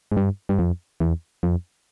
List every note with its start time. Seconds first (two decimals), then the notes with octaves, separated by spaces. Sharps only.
0.12 G#2
0.17 G2
0.49 G2
0.59 F2
1.00 E2
1.43 F2